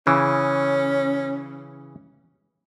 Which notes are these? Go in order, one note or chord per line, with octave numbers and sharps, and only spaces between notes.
C#3 E3 C#4